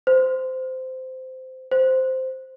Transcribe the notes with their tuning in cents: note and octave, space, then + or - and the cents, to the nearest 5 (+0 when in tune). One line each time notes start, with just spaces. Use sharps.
C5 -15
C5 -5